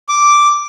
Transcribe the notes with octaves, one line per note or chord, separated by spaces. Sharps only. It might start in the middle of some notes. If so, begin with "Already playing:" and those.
D6